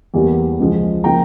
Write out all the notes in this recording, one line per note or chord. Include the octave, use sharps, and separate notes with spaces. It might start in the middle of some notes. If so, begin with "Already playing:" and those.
E2 E3 G3 A#3
C#2 C#3 F3 G#3
C#3 F3 A#3 G5 A#5